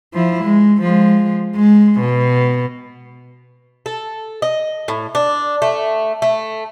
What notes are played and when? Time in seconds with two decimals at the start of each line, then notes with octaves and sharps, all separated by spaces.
0.13 F3 E4
0.44 G#3
0.82 F3 G#3
1.56 G#3
2.01 B2
3.86 A4
4.42 D#5
4.88 A2
5.15 D4
5.62 A3
6.22 A3